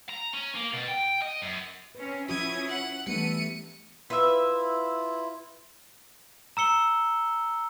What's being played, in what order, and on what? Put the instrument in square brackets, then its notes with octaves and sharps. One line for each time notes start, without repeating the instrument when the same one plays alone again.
[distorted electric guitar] A#5
C#4
A#3
B2
G5
D#5
F#2
[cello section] C4 C#4 [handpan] B4
[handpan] F3 F#4 [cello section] C#4 E4 [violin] D#6 G#6
[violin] F#5
[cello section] E3 A3 [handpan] G3 B3 D4 [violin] C#7 D#7
[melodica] E4 F4 [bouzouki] B4 E5
[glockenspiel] A#5 E6 C#7 G7